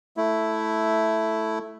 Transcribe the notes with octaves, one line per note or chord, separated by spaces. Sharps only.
A3 E4